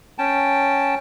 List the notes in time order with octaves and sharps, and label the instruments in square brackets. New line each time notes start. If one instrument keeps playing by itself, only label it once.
[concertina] C#4 G5 A5